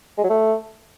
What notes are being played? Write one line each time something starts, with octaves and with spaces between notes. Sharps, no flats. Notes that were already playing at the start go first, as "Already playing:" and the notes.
G#3
F#3
A3